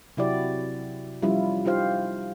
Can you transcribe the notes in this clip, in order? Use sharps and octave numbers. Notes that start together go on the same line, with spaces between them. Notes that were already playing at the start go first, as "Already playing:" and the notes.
C3 F#3 E4 F#4 G4 D5
F3 G3 C#4 E4 F4
D#4 F4 G4 C5 F5